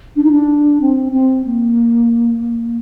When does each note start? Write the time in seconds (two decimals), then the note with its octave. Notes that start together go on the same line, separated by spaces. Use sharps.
0.16 D4
0.24 D#4
0.31 D4
0.81 C4
1.13 C4
1.45 A#3